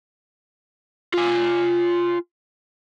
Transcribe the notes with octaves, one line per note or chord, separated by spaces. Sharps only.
F4 G#5